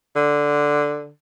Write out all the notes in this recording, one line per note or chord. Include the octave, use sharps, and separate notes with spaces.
D3